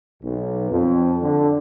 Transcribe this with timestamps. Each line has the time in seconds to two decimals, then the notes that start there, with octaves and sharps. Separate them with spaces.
0.23 B1
0.70 F2
1.22 D3